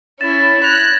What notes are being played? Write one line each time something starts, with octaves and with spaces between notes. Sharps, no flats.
C#4 E4 A6 E7
F#6 G#6 A#6 F7